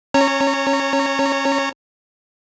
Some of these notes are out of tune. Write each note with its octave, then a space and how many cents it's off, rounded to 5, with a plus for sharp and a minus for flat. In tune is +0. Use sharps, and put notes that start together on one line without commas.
C#4 -25 C#5 +0 A#5 -30